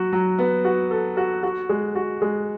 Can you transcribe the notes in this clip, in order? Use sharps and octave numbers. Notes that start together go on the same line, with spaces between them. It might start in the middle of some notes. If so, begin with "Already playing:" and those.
Already playing: F#3 F#4
F#3
B3
F#4
A4
F#4
F#4
G#3
F#4
G#3